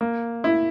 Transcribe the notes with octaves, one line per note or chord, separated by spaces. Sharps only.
A#3
E4